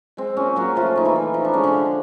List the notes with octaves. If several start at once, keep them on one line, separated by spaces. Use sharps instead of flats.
G#3 C4
A#2 C#4
A#2 F#3 F#4
F3 A3 F4
A#2 D#4
E3 E4
A3
F3 D#4
D4
G#3 C#4
D3 D4
D3